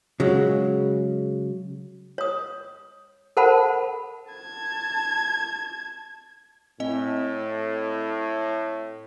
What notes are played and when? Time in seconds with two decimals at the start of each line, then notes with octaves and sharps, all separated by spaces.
0.20 C#3 F#3 G#3
2.18 C#5 D#6
3.37 A4 A#4 C5 F#5 A5 B5
4.32 A5 G#6
6.80 A2 C4 D#5